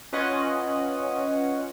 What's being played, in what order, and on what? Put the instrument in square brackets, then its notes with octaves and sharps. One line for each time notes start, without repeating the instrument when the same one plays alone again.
[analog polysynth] C#4 F4 B4 C#5 D#5 F#5